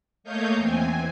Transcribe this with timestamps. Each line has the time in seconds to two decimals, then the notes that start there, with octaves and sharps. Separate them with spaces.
0.24 A3 A#3 C#5 D#5 F5 G6
0.57 E2 E3 C4 G#5